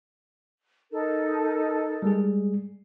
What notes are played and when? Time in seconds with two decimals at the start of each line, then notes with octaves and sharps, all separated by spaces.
0.91 D#4 A4 A#4
2.02 G3 G#3 G#4